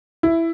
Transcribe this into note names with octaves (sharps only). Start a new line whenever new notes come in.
E4